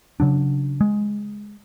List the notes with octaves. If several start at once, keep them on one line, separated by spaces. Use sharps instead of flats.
C#3 F#3 D4
G#3